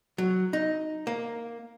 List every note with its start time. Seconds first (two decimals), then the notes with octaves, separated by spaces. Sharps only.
0.18 F#3
0.53 D#4
1.07 A#3